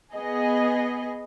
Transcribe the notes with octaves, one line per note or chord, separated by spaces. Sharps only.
B3 G#4 D#5